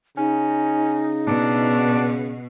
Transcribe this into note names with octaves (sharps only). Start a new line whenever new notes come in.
C#3 C#4 D#4
B2 D4